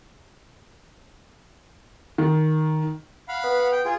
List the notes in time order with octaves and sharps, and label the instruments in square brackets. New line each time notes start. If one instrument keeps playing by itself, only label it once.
[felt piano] D#3
[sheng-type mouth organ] F5 F#5 B5
[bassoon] B3
[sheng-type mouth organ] G5
F4 G#4